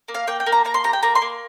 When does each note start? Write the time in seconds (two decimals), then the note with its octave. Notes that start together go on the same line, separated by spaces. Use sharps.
0.08 A#3
0.15 F5
0.27 A#3 G5
0.40 G5
0.46 A#3
0.52 A#5
0.65 A#3 A#5
0.74 C6
0.84 G4 A#5
0.93 G5
1.03 A#3 A#5
1.15 C6
1.22 A#3